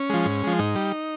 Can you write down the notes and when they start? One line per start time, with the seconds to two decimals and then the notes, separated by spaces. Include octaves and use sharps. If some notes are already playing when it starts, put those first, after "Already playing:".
Already playing: C#4
0.10 F3 G#3
0.26 G#2
0.43 F3 G#3
0.59 G#2 D#4
0.76 G3